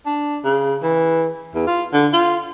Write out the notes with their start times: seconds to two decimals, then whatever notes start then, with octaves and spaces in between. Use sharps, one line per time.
0.06 D4
0.45 C#3
0.83 E3
1.55 E2
1.67 F4
1.93 D3
2.13 F4